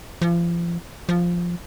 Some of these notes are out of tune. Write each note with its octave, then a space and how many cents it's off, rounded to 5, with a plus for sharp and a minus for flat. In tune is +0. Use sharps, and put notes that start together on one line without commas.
F3 -35
F3 +0